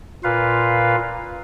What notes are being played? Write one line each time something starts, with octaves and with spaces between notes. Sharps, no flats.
A#2 F4 B4 F5